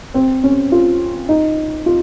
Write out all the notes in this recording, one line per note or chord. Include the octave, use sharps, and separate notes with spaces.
C4
C#4
F4
D#4
F4